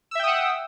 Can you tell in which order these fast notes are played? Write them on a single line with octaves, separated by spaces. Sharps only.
E6 E5 G5 D#6 F#5